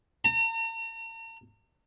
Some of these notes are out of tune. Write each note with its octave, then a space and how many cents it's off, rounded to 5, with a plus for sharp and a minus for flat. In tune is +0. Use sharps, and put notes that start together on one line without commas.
A#5 -45